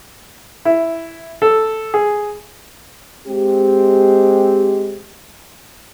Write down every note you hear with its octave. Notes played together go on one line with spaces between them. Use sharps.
E4
A4
G#4
G#3 C4 G4